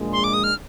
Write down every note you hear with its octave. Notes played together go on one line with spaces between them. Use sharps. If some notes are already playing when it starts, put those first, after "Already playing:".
Already playing: A#1 A#2 G#3 D4
C6
D6
D#6
F6